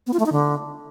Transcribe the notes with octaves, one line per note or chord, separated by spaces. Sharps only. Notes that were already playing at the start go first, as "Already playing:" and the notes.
B3
F4
A3
D#4
D3